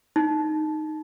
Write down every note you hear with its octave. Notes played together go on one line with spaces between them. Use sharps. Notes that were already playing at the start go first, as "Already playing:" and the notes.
D#4